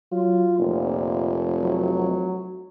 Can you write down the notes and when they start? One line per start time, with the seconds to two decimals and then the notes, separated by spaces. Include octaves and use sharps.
0.12 F#3 F4
0.58 F1 A#2
1.60 F#3